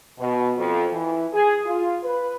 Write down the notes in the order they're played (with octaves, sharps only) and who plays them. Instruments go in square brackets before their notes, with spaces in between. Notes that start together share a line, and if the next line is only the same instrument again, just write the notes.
[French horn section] B2
F2
E3
G#4
F4
B4